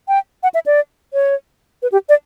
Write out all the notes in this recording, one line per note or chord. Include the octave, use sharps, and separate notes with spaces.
G5
F#5
E5
D5
C#5
B4
G4
D5